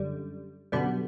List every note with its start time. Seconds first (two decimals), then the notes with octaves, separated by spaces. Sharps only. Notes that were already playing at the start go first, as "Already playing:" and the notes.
Already playing: F#2 D3 G3
0.72 F#2 B2 D3 G3 B3